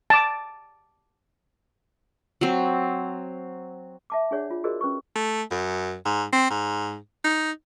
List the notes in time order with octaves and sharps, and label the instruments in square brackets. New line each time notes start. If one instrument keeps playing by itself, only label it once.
[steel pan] A5 D6
[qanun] F#3 C4
[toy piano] E5 A5 D6
D4 G#4 C#5 D5 F#5
F4
F#4 G#4 A#4 C5 D5 D#5
C#4 B4 C#6
[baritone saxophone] A3
F#2
G#2
C4
G#2
D#4